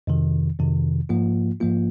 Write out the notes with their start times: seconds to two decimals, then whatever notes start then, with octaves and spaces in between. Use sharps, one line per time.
0.07 F2 C3 D#3
0.58 F2 C3 D#3
1.09 G#2 F3 A#3 F4
1.60 G#2 F3 A#3 F4